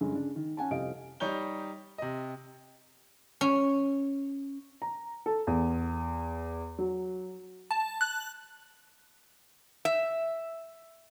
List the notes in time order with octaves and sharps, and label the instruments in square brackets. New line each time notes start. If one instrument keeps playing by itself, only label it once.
[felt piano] G2 D3 G#3 C#4
C#3 D4
D#3
C#4 F#5 G#5 A5
C2 F2 G4 D#5 F5 D7
[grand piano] G3 D#4 C#5 A#5 G6 G7
C3 D#5
[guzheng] C#4
[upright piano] A#5
A4
E2
F#3
[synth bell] A5
F#6
[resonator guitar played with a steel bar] E5